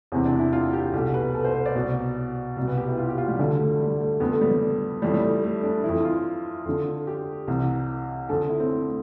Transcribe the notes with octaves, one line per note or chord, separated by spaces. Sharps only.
E2 C3 E3 C4
D4
E4
F4
G4
C2 B2 A4
B4
A4
C5
C5
D5
C2 B2
C2 B2
B4
G4
E4
F4
G4
F4
G3
D2 D3 A3
A3
G3
A3
F2 D3 B3
A3
G3
G3
F2 E3 G3
G3
A3
A3
D4
F2 E3 E4
F4
F2 D3
G4
C2 C3 E3
F2 D3 A4
E4
C4
A3